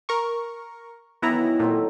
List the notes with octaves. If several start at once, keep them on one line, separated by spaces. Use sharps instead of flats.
A#4 C#6
D#3 E3 F#3 B3 E4 A#5
A#2 F#3 C4 A4